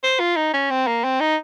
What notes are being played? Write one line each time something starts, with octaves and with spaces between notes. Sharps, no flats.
C5
F4
D#4
C#4
C4
A#3
C4
D#4